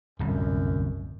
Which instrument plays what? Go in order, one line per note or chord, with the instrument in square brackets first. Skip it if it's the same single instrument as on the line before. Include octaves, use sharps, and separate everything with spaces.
[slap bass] D1 C2 [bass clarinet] F#2